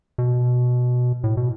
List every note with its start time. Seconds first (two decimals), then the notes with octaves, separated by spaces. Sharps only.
0.18 B2
1.24 A2
1.37 B2